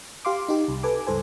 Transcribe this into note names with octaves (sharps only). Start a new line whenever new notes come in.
G4 F5 C6 D6
D#4 G4
C2
A4 B4 G#5 D6
C#2 G2 A4 C5 G#5